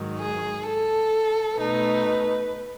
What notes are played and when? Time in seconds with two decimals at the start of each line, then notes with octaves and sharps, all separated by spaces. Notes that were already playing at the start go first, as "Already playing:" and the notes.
Already playing: G#2 D#3 F#3
0.22 G#4
0.68 A4
1.58 B2 A3 D#4 B4